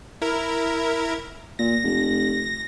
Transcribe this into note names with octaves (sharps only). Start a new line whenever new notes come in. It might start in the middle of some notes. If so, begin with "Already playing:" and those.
E4 A#4
A#2 A#6
F1